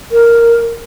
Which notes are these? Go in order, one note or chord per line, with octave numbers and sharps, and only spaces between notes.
A#4